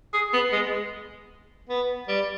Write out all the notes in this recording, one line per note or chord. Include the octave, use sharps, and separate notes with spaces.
G#4
B3
G#3
B3
G3